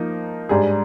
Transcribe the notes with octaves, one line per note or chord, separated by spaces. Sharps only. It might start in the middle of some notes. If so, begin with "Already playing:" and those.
Already playing: F3 A#3 D#4
G#2 G3 D4 G#4